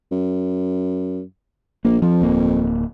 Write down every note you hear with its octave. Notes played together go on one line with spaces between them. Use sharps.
F#2
A#1 A#3
F2 F3
D1 A#3